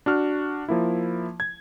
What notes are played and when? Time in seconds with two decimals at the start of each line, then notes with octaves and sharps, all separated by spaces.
0.06 D4 F#4 F6
0.68 F3 A#3 E4
1.40 G#6